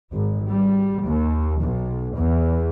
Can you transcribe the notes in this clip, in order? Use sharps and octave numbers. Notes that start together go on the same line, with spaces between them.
G#1
G3
D#2
B1
E2